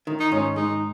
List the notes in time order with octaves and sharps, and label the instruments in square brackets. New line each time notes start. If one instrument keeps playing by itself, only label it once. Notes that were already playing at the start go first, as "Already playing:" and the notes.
[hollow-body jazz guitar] D#3
[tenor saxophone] D#4
[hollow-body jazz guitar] G#2 [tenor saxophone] C#4
[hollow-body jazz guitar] G#3 [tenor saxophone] D#4